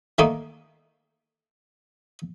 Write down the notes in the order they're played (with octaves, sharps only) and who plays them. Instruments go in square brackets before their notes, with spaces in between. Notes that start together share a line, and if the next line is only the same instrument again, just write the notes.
[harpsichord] D#3 A3 A#3 D#4